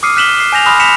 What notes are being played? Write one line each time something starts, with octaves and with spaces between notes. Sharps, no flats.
D6 D#6 F6 C7 C#7 D#7
F6 F#6 B6 E7 F#7 G7
C7
G#5 G6 A#6 F7
B5 C6 D#6 F6 F#6 A#6
B6 C#7 E7 F7